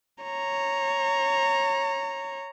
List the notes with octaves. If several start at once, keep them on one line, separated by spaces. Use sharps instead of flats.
C#5 A#5